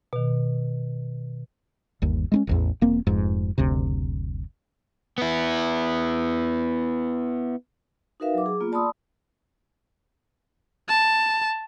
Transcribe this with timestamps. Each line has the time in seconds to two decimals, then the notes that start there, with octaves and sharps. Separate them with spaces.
0.13 B2 D#3
2.02 G1 D#2
2.32 G#3 B3 C#4
2.47 E1 A1 E2
2.81 E1 A#3 C4
3.07 F1 F2 G#2
3.58 F#1 D2 C3
5.18 B3 E4
8.20 D#4 F#4 A#4 B4 E5 F5
8.34 F#3 D6
8.46 G#4
8.60 A#3 B3 F4
8.72 D5 A5 B5 C6 D#6 E6
10.89 A5